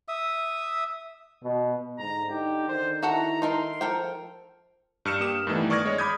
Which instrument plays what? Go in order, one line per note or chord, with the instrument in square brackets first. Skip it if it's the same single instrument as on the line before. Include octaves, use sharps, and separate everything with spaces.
[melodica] E5 D#6
[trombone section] B2
[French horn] G#2 [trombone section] D3 [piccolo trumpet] A#5
[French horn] D#4 [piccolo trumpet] G4
[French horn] D#3 [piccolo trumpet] C5
[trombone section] E4 [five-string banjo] F#4 A4 F#5 [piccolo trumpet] A#5
[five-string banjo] D#4 A4 A#4 [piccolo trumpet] C6
[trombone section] F3 [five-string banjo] A4 A#4 G5
[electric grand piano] G2 F6 C#7 E7
A#3 G4 D#6 E7
G2 D#3 E3 A3 B3
D5 C#6 D#6 F6 G#6 A#6
G#3 C#5
B5 D6 D#6 G6 G#6